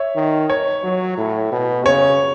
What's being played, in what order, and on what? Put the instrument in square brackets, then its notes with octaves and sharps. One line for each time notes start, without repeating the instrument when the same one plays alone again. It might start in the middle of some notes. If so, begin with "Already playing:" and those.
Already playing: [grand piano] C#5 E5
[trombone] D#3
[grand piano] C#5
[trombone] F#3
A2
B2
[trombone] C#3 [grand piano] C#5